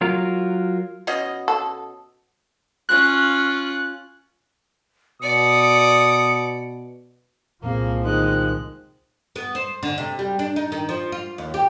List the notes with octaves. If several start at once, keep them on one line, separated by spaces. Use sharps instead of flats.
F#3 F4 A#4
B2 C#4 D#5
A4
C#4 F4 F#6
B2 D5 D#6 C#7
C2 A#2 F3 A#3 C4 G#4
D#3 G#3 F#6
B3
C5
D3
C3
G3
D4
D#4
D#3
F3
F4
D#2
G4